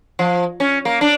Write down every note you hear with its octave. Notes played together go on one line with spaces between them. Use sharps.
F3
C#4
A#3
D4